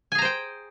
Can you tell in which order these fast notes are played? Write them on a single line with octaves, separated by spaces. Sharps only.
G#5 G#4 A#5 C5 G5